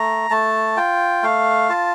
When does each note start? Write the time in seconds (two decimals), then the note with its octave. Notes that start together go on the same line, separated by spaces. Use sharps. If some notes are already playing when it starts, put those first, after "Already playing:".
Already playing: A3 A#5
0.30 A3 A5
0.77 F4 G5
1.23 A3 F5
1.69 F4 A5